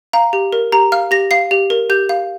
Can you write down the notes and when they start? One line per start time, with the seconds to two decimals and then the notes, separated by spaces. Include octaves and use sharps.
0.13 F5 A#5
0.33 G4
0.52 A#4
0.72 G4 A#5
0.92 F5 F6
1.11 G4 A#6
1.31 F5 C7
1.51 G4
1.70 A#4
1.90 G4 G6
2.09 F5